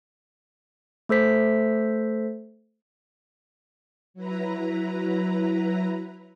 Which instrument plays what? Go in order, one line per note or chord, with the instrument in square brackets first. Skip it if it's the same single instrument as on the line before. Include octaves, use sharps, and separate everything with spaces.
[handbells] A3 A4 C5 B6
[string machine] F#3 E4 B4 A#5